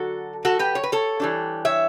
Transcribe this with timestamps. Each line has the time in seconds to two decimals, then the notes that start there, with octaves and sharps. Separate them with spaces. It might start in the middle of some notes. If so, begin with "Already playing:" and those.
Already playing: D3 F#3 F#4 A4
0.45 F#4 A4
0.59 G4 B4
0.75 C#5
0.83 B4
0.92 A4 C#5
1.20 E3 G3 D4
1.65 C#5 E5